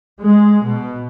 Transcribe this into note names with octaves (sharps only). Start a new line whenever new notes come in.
G#3
B2